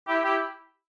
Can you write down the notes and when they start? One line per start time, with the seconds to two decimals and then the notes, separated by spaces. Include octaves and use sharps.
0.08 E4 G4
0.24 E4 G4